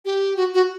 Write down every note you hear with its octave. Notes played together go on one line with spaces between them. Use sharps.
G4
F#4
F#4